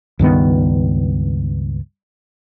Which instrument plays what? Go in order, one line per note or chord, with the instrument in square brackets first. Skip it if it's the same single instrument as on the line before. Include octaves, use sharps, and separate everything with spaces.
[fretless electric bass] C#2 G2 D#3 B3